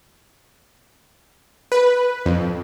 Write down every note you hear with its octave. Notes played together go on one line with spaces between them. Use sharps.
B4
F2